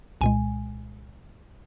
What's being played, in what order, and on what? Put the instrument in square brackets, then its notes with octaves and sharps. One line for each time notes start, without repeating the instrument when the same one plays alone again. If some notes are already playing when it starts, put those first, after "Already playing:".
[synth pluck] C2 A#2 G#3 G#5